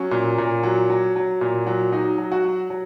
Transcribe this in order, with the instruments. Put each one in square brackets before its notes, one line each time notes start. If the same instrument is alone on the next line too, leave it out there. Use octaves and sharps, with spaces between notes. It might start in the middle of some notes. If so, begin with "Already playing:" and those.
Already playing: [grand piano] F#3 C#4
A#2
A#2
F#3
F#3
F#3
A#2
F#3
F#3 D#4
F#3
F#4
F#3
F#3